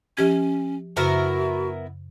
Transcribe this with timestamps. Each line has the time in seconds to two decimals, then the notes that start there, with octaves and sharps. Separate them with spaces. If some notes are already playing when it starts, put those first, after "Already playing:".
0.17 F3 C#4 G4 G#6
0.97 F#2 C#3 B3 E4 F#4 A#4